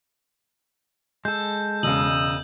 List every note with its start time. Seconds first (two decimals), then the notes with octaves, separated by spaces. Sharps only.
1.25 G#3 A4 G6
1.83 E1 C#3 D#5 D#6 E6 F#7